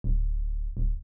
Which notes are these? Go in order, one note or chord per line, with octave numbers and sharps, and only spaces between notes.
D1
D1